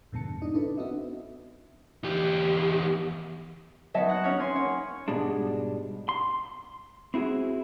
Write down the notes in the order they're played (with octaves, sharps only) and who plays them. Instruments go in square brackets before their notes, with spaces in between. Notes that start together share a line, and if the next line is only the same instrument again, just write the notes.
[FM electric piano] F2 G#2 B2 D3 A5 C#7
D4 D#4 D#5
C#4 D4 E4 A4 B4
B3 C4 D4 F#4 D#5 E5
[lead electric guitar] E2 G4
[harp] F#3 B3 D#4 [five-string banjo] D#5 E5 A5
[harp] F#5 F#6 A#6
[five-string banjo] B3 C#4 [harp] C#5 F6
[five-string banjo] C#4 [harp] G#5 C6
[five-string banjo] A#3 F#5 [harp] C#4 C#5
[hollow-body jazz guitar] G#2 B2 G3 G#3 D4
C6
C4 E4 F#4 G#4